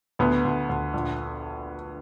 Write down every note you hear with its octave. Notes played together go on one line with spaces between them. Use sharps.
D2 B3
D2
D2
A#1